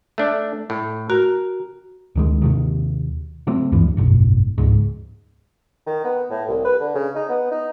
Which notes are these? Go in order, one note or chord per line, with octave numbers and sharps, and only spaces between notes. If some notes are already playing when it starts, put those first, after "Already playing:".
A3 D4
A2
F#4 A#4
D2 D#3 G#3
D#2 C3 D#3
C#3 F#3 A3 C4
D2 G2 E3 F3
F#1 B1 G#2
C#2 G#2
D#3
B3
A2
C2
B4
D3
C#3
D#4
B3
D#4